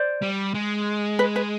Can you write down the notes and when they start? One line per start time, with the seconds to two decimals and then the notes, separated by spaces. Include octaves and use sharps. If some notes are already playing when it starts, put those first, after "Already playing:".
Already playing: C5 D5
0.22 G3
0.54 G#3
1.19 B4
1.36 B4